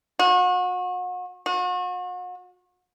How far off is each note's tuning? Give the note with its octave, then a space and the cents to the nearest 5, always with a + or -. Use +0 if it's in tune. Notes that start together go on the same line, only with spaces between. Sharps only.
F#4 -35
F#4 -40